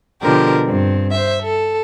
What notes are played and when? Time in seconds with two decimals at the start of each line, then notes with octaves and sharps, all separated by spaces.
0.22 B2 D3 F3 G4 A#4
0.65 G2 C4
1.11 C5 E5
1.41 A4